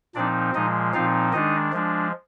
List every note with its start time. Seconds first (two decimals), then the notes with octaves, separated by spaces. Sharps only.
0.15 A#2 F3 C4 D4 D#4 D5
0.54 A#2 F3 G#3 D#4 D#5
0.94 A#2 F3 C4 D#4 F4 F5
1.33 D#3 G#3 D4 D#4 D#5
1.72 F3 G#3 D4